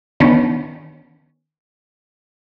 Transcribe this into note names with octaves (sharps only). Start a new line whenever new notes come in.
D#3 B3 C#4 D4